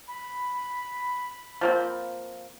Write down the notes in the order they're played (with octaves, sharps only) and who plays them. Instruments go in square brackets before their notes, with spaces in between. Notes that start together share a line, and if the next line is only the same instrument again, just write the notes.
[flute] B5
[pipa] F3 A#3 C4